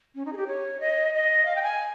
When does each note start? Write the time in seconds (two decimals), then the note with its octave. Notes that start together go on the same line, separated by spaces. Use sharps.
0.15 C#4
0.25 D#4
0.33 G#4
0.37 G4
0.47 C#5
0.80 D#5
1.14 D#5
1.45 F5
1.56 G5
1.62 G#5